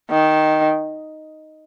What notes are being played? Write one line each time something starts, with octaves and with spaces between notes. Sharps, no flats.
D#3